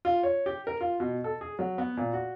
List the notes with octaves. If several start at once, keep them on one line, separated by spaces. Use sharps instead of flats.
F4
C#5
G4
A#4
F4
B2
A4
G#4
F#3
B3
A#2
F#4